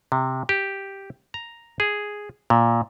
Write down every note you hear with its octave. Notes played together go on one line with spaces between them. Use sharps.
C3
G4
A#5
G#4
A#2